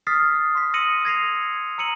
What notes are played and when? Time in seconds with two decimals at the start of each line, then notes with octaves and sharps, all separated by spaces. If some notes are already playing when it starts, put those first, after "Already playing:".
0.07 D#6 F6 A6 B6 C7
0.55 C6 B6
0.74 D#6 E6 A#6 C#7 D#7 F#7
1.05 G#6 A#6 C7 F7
1.78 A#5 E6 C#7 D#7 F#7